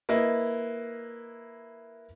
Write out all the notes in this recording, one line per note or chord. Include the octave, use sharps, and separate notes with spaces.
A#3 E4 B4 D#5